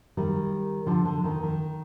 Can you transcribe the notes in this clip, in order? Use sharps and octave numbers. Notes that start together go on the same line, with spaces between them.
D#3 G3
D3 F3
D3
D#3
D#3